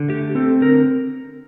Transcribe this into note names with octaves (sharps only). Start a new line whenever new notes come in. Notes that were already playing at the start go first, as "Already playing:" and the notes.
Already playing: D3
A3 G4
C4 A4
D3 A#4